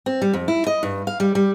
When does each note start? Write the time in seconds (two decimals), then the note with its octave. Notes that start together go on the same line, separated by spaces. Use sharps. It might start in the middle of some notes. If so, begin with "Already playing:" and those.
0.06 C4
0.22 G3
0.33 F2
0.48 E4
0.67 D#5
0.83 G2
1.07 F5
1.20 G3
1.35 G3